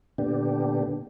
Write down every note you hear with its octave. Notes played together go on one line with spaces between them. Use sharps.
A#2 D3 B3 D4 G4